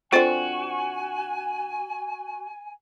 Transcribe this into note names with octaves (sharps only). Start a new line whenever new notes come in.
D3 C4 F4 F#4 C5 F#5 G#5